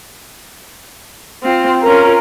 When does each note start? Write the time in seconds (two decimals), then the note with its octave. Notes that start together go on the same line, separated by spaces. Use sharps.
1.43 C4 F4
1.85 C#4 F4 A#4